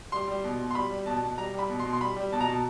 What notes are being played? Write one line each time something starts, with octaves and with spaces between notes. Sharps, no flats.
G3 C6
G3
B2
B2
C6
G3 B5
G3
B2 A5
B2
G3 A#5
G3
B5
B2
C6
B2
C6
G3 B5
G3
B2 A5
A#5
B2 A5